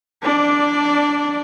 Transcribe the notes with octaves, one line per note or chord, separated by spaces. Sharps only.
D4 D5